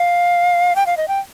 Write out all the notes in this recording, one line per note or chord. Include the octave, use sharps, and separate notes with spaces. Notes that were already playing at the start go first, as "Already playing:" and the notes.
Already playing: F5
G5
F5
D#5
G5